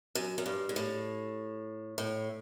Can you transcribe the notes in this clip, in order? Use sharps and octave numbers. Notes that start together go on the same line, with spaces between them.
F#2
F#2
G2
G#2
A2
A2